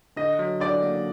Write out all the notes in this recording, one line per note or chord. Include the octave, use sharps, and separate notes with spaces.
D3 D#5
F#3
D3 D5
A#3